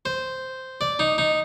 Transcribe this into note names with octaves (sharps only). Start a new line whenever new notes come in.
C5
D5
D#4
D#4